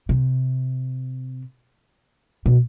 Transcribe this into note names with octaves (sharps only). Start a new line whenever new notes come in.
C3
B2